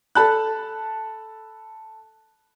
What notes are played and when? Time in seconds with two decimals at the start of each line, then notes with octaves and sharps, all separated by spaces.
0.15 A4 A5 B5 F#6